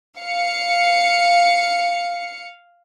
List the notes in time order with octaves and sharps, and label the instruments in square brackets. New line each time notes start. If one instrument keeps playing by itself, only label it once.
[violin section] F5 C#7